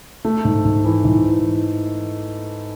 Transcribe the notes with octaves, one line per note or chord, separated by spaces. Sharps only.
A3
G#2
G#2
E3
G#2
E3